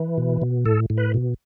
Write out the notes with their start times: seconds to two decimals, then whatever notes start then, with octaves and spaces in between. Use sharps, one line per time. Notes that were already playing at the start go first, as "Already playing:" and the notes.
Already playing: E3
0.18 B2
0.42 B2
0.65 A2 A4
0.90 A2
0.98 B4
1.14 B2